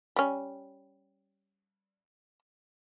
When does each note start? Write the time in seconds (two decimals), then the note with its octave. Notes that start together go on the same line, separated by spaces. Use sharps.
0.16 G3 C#4